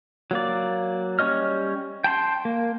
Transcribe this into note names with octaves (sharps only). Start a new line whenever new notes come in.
F#3 A#3 D5
G3 C#4 C#5 D#5 F6
G5 A5 B5 C6
A#3